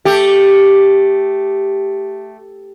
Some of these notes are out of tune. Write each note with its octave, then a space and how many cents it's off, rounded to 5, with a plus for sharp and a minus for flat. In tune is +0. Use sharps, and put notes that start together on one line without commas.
A3 +0 G4 +0